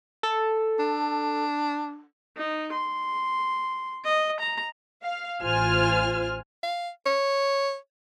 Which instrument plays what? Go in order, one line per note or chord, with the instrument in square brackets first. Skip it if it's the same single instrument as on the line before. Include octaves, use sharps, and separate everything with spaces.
[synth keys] A4
[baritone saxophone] D4
[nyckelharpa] D#4
C6
D#5
A#5
[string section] F5
A1 F4 C5 G#5 F6
[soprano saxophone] F5
C#5